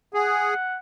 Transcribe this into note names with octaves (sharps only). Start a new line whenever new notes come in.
G#4 F#5